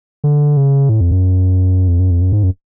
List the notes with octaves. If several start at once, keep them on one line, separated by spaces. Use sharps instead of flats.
D3
C#3
A2
F2
F#2
F2
F#2
F2
F#2
G#2
F#2